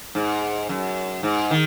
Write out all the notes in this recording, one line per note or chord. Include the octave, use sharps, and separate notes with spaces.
G#2
F#2
G#2
D#3